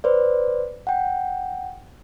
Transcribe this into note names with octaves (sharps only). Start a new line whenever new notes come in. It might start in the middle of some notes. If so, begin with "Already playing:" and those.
B4 C5 D5
F#5 G5